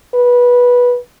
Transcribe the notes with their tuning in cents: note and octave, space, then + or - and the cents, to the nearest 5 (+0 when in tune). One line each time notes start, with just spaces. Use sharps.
B4 -15